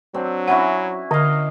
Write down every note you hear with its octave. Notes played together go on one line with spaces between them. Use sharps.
F#3 C4 D4
C#4 E4 F#4 F#5
D3 D#5 F5